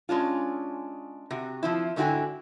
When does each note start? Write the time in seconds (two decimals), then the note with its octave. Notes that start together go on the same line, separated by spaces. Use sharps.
0.09 G#3 C#4 D4 F4
1.31 C3 F#4
1.63 F3 C4 E4
1.96 G#2 D3 E4 F#4 G5 G#5